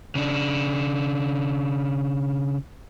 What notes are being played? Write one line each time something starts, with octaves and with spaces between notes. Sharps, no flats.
C#3 D4